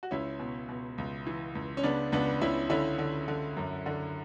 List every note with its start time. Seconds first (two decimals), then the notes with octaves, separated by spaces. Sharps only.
0.03 F#4
0.11 C#2 C#4 E4
0.39 B2
0.69 B2
0.98 C#2
1.27 E3
1.55 C#2
1.77 C#4
1.83 C#3 B3 D4
2.12 C#2 B3 D4
2.41 C#2 C#4 E4
2.70 D3 C#4 E4
2.98 D3
3.28 D3
3.57 F#2
3.86 D3